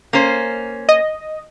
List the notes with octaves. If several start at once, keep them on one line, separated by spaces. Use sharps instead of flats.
A#3 C#4 C5
D#5